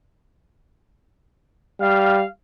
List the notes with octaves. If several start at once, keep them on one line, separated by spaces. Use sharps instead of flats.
G3 F5